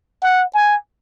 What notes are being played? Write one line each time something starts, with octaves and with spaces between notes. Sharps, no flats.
F#5
G#5